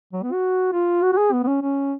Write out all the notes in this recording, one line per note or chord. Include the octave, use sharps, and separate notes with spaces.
F#3
B3
F#4
F4
F#4
F#4
G#4
B3
B3
C#4
C#4